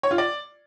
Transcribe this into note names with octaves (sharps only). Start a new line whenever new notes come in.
C#5
F4
D5